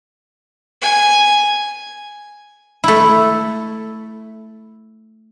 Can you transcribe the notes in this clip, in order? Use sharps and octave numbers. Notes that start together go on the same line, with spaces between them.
G#5
A3 E4